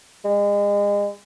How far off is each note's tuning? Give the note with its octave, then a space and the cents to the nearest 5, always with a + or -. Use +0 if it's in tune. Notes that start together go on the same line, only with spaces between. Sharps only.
G#3 -35